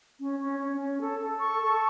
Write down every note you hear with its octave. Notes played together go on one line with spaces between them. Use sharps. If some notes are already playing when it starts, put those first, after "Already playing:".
C#4
C#4
C#4
C#4
A4
A4
C#6
A4